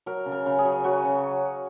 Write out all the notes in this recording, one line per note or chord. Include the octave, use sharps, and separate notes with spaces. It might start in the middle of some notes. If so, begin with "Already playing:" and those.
F#3 A#4
C#3
A#4
C#3
G#4
F#3
F#3 F#4
C#3